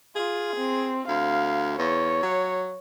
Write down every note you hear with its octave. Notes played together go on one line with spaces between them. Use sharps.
F4 G#4
C4
D2 F5
E2 C#5
F#3